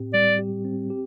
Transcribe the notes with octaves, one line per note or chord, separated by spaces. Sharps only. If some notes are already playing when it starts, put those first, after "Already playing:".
Already playing: A2 C4 G4
G3 D5
G4
C4
G4